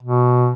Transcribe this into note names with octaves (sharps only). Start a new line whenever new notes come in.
B2